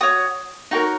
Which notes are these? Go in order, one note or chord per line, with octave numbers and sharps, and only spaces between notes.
F#4 C#5 D#6
D#4 F#4 A#4 C#5